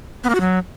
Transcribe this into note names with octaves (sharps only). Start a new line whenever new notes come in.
B3
A#3
F#4
F#3